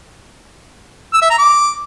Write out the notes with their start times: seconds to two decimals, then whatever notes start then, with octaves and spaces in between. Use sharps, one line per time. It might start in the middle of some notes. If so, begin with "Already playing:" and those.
1.13 E6
1.22 E5
1.30 A#5
1.38 D6